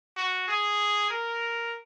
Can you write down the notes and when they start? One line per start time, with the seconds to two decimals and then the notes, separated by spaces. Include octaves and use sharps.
0.17 F#4
0.48 G#4
1.10 A#4